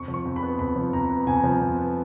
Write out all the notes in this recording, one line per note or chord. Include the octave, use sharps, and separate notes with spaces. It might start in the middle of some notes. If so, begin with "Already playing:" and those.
Already playing: F2 C#6
F3
C#6
F2
B5
B3
F2 B5
F3
F2 A#5
B3
F2 G#5
F3
F2
B3